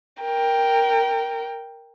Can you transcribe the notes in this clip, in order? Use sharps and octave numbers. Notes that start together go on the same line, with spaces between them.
A#4 G5